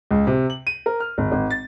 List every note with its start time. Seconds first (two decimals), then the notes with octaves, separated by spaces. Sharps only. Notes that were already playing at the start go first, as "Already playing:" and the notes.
0.11 C#2
0.27 C3
0.50 F#7
0.67 D#7
0.86 A#4
1.00 F6
1.18 G#1
1.32 G#1
1.50 A6